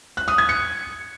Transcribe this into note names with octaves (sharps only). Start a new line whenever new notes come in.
F#6
D#6
G#6
C#7